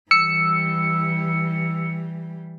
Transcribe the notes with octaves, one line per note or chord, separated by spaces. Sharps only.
E3 G3 E6 C#7